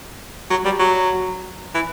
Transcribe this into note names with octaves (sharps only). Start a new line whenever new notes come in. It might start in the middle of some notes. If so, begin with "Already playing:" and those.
F#3
G3
F#3
E3